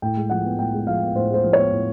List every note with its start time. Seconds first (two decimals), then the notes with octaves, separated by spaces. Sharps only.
0.02 A2 G5
0.17 G#3
0.30 F3 F#5
0.45 B3
0.58 A2 G5
0.73 G#3
0.87 F3 F5
1.02 B3
1.15 A2 C5
1.30 G#3 C5
1.44 F3
1.53 B3 C#5
1.72 A2